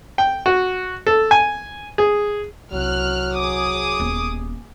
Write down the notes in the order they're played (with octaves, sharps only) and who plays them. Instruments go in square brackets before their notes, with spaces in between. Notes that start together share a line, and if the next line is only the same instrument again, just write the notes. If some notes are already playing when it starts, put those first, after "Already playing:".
[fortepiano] G5
F#4
A4
G#5
G#4
[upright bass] C2 [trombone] F#3 [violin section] F6 F#6
[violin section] G#4 D6 D#6
[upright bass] D#1 B3